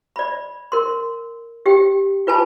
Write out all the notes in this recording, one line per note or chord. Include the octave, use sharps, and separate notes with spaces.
D5 B5
A#4 C6
G4 G5
F4 B4 G#5 A5 B5